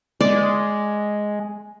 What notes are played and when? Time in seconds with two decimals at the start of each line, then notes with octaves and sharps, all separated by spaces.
0.21 G#3 D5